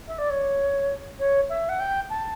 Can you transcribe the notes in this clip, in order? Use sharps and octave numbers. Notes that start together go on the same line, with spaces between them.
E5
D5
C#5
C#5
E5
F#5
G5
A5